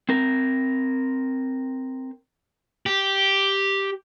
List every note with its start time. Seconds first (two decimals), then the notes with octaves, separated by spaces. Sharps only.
0.09 C4 A#4
2.86 G4